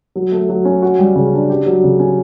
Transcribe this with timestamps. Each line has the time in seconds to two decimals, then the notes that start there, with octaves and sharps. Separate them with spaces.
0.16 F#3
0.32 A3
0.49 F#3
0.65 C#4
0.82 F#4
0.99 G3
1.16 C#3
1.33 D4
1.50 G4
1.66 F#3
1.84 C#3
2.00 C#4